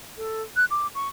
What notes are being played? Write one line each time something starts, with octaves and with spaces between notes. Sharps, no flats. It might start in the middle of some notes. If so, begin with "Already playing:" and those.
A4
F#6
D6
C#6